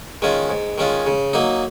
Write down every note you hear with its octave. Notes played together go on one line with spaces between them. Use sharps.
D#3 G#3 C#4 F4
G#2
D#3 G#3 C#4 F4
C#3
F#3 A#3 D#4